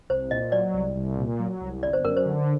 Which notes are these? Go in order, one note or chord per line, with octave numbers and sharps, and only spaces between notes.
C2 C5
A#2 D#5
F#3 D5
C2
C2
A#2
F#3
C2
G1 D5
C5
F#2 A#4
C5
D3